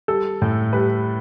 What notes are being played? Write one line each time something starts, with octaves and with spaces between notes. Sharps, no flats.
G3 A4
A2
G3 B4